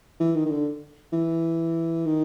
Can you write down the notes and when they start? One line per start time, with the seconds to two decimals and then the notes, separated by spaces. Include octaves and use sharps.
0.20 E3
0.35 D#3
0.45 D#3
0.51 D3
1.13 E3
2.06 D#3